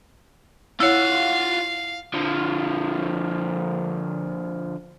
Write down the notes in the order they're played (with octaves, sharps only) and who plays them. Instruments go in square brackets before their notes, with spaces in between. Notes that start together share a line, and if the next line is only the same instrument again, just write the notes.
[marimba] E4 C#5 [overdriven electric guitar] F4 F#5 [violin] F5
[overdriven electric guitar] D3 F3